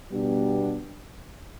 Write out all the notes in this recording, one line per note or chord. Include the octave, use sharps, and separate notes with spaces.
B2 G3 B3 D4 G4